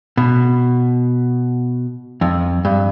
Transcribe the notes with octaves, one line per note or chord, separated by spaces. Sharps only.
B2
F2
G2